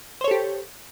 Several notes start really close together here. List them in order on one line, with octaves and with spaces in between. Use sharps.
C5 C#5 A4 G4